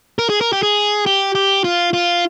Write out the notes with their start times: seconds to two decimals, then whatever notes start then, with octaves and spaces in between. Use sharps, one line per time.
0.19 A#4
0.29 G#4
0.41 A#4
0.53 G4
0.63 G#4
1.06 G4
1.35 G4
1.64 F4
1.93 F4